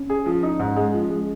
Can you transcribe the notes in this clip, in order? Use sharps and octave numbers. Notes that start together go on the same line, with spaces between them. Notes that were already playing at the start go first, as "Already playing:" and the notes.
Already playing: C#4
G#4
F3
D#4
G#2
G#3
F3
G#3